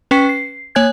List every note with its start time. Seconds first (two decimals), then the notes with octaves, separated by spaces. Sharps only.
0.11 C#4 B4 G5 C#6 B6 C#7
0.29 C7
0.75 A#3 C#5 G#5 F#6 G#6